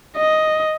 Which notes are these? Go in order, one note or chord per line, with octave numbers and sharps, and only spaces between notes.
D#5